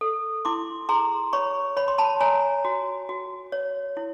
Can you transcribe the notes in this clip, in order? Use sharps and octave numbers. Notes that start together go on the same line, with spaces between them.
A4
E4 C6 D6
G#4 A#5 C6
C#5 B5 C#6
C#5 B5
C6
A5 B5
C#5 G#5 A#5
F#4
F#4
C#5
E4